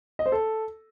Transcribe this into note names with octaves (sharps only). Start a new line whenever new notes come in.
D#5
C5
A4